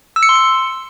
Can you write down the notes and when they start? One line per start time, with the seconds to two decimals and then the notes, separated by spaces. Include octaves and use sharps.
0.16 E6
0.23 C#7
0.29 C6
0.35 C#7